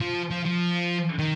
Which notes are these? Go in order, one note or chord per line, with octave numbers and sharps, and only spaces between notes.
F3
F3
F3
D#3